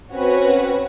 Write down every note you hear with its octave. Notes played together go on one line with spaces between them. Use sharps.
C4 C#4 F#4 B4 C#5